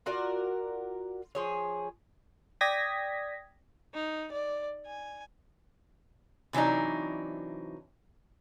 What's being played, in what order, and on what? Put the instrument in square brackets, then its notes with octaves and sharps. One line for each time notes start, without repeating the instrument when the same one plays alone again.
[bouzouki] F4 F#4 A#4 D5
F3 G#4 C#5
[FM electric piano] D5 G5 D#6 G#6 A#6 B6
[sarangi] D#4
D5
G#5
[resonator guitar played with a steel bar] C3 E3 F#3 D4 D#4